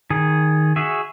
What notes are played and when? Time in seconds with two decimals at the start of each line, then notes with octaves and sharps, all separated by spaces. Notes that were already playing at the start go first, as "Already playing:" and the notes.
0.10 D#3 G#4
0.76 F#4 G#4 E5